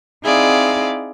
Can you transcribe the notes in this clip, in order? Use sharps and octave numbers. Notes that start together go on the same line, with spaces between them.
C4 D#4 E4 G#4 D5 F5